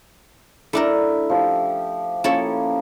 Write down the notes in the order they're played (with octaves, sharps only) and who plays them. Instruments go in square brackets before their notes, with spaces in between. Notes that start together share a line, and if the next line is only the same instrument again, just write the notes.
[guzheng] A3 D4 A#4 [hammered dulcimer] E4
[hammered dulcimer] F3 G4
[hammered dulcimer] F3 A#3 C#4 [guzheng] E4 A4 C#5